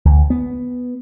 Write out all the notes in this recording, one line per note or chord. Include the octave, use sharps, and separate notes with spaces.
D2
B3